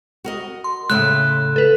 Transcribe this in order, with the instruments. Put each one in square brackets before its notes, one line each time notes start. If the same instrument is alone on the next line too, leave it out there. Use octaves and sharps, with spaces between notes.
[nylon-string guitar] F#4 A#4 D#5
[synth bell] C6
[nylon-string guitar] A2 C#3 A3 [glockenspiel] F#6
[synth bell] A4 B4